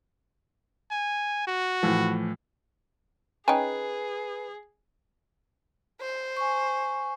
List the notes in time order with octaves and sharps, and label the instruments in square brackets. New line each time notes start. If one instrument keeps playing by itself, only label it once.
[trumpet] G#5
F#4
[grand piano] A2 E3 F3
[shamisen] C#4 D#4 [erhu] G#4 [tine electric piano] B4 [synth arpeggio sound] G5
[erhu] C5
[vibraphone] G#5 C#6